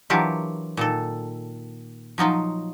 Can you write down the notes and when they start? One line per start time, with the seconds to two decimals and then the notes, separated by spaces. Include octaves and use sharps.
0.10 E3 F#3 D4 F4 G4 A#4
0.77 A#2 D#3 A4
2.18 F3 F#3 D#4 F4